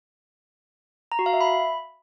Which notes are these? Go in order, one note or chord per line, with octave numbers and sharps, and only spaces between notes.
A#5
F#4
F5
E5
B5